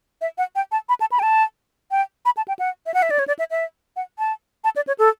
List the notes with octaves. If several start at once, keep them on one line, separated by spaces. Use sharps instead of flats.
E5
F#5
G5
A5
B5
A5
B5
G5
A5
G5
B5
A5
G5
F#5
E5
F#5
E5
D5
C#5
D5
E5
E5
F#5
A5
A5
D5
C#5
A4